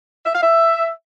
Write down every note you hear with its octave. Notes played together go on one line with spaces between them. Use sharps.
E5
F5
E5